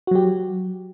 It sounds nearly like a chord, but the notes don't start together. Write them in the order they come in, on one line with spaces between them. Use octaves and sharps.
F#4 F#3 G4